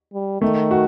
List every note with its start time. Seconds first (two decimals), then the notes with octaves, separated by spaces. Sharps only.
0.14 G3
0.41 D#3 A3
0.71 F#4